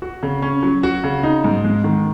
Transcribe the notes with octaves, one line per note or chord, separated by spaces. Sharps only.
F#4
C#3
C#4
F#3
F#4
C#3
D#4
G#2
G#3
D#3